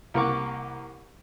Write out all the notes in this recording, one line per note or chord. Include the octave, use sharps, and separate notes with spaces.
C2 A#3 A#4 F#5 C#6 D6